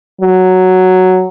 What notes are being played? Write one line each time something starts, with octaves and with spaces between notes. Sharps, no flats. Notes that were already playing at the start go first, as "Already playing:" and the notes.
F#3